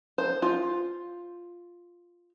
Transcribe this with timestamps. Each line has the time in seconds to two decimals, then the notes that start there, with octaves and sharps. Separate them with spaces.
0.18 C5
0.42 F4